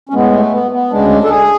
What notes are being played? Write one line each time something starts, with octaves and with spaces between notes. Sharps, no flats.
C#4
A2 G#3 B3
A3
B3
B3
D2 C#3 G#3 D4
A4
G#4